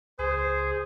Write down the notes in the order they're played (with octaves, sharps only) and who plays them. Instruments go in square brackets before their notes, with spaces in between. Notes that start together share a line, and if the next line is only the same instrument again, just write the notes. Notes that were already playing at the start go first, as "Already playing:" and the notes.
[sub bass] C#2 [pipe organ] G#4 [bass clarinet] C5